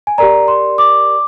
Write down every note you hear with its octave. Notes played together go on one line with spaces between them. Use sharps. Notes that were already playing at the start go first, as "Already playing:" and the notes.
G#5
G4 A#4 D5 A#5
C6
D6